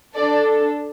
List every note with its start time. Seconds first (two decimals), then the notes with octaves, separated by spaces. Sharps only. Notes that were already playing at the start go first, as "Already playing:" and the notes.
0.16 D4 A4 D5